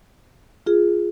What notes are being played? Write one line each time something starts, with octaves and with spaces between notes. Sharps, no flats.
F4 G#4